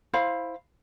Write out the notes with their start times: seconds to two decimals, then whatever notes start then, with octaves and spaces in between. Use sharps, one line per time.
0.13 E4 C5 F5 B5